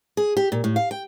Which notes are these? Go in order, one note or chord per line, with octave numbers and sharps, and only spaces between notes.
G#4
G4
A#2
A2
F5
G5